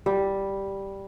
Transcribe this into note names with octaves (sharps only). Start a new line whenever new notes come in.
G3